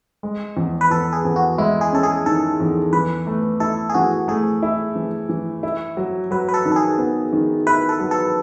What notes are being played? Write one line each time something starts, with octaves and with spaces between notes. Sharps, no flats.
G#3
E2
B4
E2 A4
G#4
E2
F#4
G#3 E4
G#4
C#4 A4
G#4
D#3 A4
E2
E3 B4
A3
E4 A4
G#4
E3 F#4
A3 G#4
E4
E3
E3
E4
F#3
F#3 B4
B4
A4
D#3
A4
G#4
B3
D#3
E4 B4
A4
F#3
A4